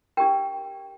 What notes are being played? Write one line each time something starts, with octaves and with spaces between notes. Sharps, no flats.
D4 G4 A#4 G5